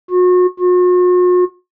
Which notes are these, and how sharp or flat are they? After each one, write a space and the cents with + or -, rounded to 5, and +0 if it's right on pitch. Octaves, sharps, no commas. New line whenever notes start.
F#4 -35
F#4 -45